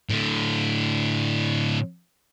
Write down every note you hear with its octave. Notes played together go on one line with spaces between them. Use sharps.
A2 D3